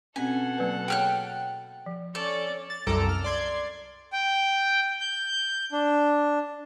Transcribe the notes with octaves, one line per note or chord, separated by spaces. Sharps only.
B2 C4 C#4 A4 F#5 G#5
F#3 A#3 B4
G#4 C#5 G5 F6 F#6
F3
C#4 A4 C#5 D5
A6
C2 F#2 A4 A#5 D6
F6
D5 C6 G#6
G5
G6
D4